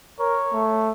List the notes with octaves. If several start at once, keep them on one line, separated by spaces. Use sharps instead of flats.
A#4 C#5
A3